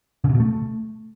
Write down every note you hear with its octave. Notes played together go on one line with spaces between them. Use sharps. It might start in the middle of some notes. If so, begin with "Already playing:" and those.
C#3
C3
B2
A3